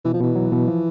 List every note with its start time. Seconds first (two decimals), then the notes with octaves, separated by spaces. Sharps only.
0.05 B2 E3
0.14 F3
0.21 B2 E3
0.36 F#3
0.52 B2
0.68 F3